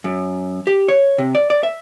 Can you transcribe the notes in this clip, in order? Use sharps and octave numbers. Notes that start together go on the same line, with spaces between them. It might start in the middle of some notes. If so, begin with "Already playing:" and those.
F#2
G4
C#5
C3
D5
D5
E5